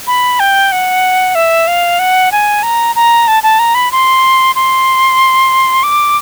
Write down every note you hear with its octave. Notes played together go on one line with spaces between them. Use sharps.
B5
G5
F#5
E5
F5
F#5
G#5
A#5
A#5
A5
A5
A#5
B5
C6
C6
D6